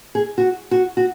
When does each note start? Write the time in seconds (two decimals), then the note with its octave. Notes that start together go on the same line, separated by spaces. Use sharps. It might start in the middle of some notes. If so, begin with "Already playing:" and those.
0.15 G#4
0.38 F#4
0.71 F#4
0.97 F#4